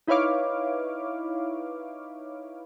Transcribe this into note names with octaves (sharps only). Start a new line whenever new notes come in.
D#4 E4 B4 C#5 F5 D6